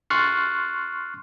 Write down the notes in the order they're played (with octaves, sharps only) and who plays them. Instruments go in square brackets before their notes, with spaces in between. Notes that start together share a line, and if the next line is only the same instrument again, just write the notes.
[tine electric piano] C6 C#6 F6 F#6 A6 C7